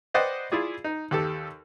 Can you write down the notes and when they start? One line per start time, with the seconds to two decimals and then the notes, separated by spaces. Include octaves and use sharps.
0.14 B4 C5 D5 D#5 F#5 G5
0.52 E4 F4 G#4 D5
0.84 D#4
1.11 D#2 G4 A4